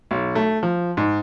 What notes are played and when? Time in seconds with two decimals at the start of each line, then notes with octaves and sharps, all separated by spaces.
0.11 B1
0.35 A3
0.63 F3
0.97 G#2